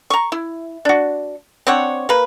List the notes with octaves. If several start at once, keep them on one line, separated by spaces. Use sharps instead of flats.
A#5 C#6
E4
D4 F#4
C4 D4 C#5 F#5
A#3 B4